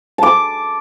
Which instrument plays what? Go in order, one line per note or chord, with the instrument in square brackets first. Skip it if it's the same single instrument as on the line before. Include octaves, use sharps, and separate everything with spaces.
[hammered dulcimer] A5 D6